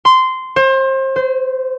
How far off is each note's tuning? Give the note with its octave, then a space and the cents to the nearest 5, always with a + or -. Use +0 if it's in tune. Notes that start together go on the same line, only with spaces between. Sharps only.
C6 -15
C5 +30
C5 -25